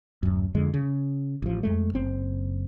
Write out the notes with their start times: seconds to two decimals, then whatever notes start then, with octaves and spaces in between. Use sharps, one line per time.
0.23 D1 F#2
0.55 F2 D3 G#3
0.74 C#3
1.42 A1 F3
1.63 F2 G#3 A3
1.93 F#1 C4